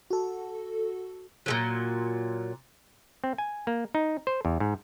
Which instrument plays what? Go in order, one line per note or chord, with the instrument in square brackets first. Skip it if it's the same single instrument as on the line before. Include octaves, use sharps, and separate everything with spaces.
[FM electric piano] F#4 A4
[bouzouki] A#2 D3 F#3
[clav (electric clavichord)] C4
G#5
A#3
D#4
C5
E2
G#2